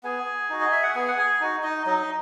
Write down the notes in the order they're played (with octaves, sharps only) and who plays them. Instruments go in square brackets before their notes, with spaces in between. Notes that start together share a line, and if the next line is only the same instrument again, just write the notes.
[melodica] B3 G#4 G#5
D#4 F#4
D#5
E5
F#5
B3 G#4 G#5
F#5
G#4 G#5
D#4 F#4
D#4 D#5
F#3 D#4 D#5